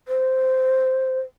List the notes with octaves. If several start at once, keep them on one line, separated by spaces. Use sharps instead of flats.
C5